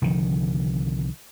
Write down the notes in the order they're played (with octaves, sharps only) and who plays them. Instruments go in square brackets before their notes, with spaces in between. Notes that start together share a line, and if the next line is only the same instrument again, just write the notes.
[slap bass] C2 D3 D#3 F3